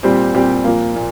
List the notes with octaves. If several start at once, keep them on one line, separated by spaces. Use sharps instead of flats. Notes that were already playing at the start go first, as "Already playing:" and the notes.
A#2 G3 C4 G4
A#2 G3 C4 G4
A#2 F3 A#3
A#2